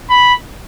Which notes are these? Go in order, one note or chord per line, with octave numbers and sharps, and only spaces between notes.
B5